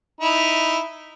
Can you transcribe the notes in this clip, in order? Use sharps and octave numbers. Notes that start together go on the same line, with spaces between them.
D#4 E4